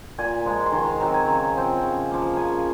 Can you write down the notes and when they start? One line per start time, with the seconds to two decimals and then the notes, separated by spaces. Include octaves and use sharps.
0.18 A#2 G#5
0.45 F3 G#3
0.66 C6
0.72 D#3 A#5
0.87 C6
1.00 F#3 C4 A#5
1.14 G#5
1.27 C#3
1.56 F3 C4
1.82 C#3
2.11 F3 A#3
2.37 C#3 G#5